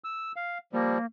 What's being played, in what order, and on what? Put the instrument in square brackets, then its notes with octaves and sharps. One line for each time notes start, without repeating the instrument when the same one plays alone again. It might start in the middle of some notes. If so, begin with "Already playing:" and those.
[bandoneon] E6
F5
[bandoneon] F3 G3 [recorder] A#3